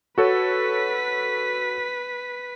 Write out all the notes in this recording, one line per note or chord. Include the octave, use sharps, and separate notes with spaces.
F#4 A4 B4 C#5 B6